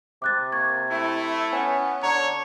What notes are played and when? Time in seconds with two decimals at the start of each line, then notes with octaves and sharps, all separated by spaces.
0.22 C3 D6 F#6 A6
0.52 A#3 C#6 G#6
0.90 A3 E4
1.52 B3 C#4
2.03 D3 C#5 A#5